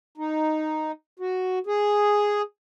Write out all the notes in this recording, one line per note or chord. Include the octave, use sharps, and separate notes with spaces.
D#4
F#4
G#4